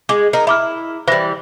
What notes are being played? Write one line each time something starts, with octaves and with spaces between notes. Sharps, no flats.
G#3 D6
D#4 A#4
E4 B5 D6 F6
E3 G3 C5 B5 A#6